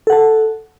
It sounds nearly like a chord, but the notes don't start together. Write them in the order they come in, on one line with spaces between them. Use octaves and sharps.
A4 F#5 A5